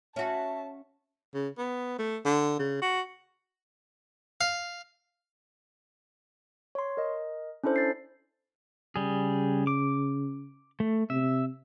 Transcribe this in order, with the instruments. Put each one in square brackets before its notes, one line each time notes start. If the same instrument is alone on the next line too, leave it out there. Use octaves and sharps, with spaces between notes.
[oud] C#4 F#4 [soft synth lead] E5 [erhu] A5
[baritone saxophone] C#3
B3
A3
D3
C#3
F#4
[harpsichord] F5
[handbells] C#5 C6
A#4 D#5
C#4 D4 E4 A4 C5
A6 C7
[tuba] C#3 [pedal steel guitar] G3 G#4
[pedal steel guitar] D6
A3
[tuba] C3 [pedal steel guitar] E5